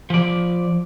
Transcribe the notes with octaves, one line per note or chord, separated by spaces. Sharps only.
F3 D5